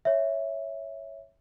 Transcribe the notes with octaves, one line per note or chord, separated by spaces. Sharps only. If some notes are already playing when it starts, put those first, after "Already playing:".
C#5 E5